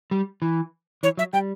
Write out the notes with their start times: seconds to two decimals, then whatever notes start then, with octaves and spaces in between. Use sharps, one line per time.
0.11 G3
0.42 E3
1.03 E3 C#5
1.18 F#3 E5
1.33 G3 G5